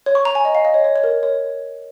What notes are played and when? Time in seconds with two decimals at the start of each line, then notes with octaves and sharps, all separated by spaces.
0.06 C#5
0.15 C#6
0.25 A#5
0.35 G#5
0.45 D#5
0.55 F5
0.65 D#5
0.74 C#5
0.84 C#5
0.96 C#5
1.04 A#4
1.23 C#5